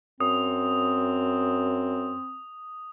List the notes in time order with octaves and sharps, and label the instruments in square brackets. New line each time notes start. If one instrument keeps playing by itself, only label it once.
[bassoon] F#2 [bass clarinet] C4 [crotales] D#6